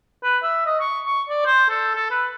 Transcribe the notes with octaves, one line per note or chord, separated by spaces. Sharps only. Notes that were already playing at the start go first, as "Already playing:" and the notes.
B4
E5
D#5
C#6
C#6
D5
C5
A4
A4
B4